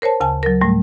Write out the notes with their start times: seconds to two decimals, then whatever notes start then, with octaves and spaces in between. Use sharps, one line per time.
0.02 A#4 C5 C#5 A5
0.20 D2 C#3 G#5 A5
0.43 F#3 A#4
0.61 A2 G3 A3